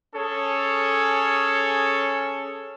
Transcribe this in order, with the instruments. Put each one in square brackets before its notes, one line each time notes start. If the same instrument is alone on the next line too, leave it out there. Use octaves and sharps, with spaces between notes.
[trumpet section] C#4 G#4 A4 C#5